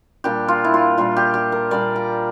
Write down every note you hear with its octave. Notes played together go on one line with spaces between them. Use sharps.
A#2 G3 D4 G4
F4
E4
F4
A#2 G3 D4 F4
G4
G4
A#4
A#2 G3 D4 D5
A#5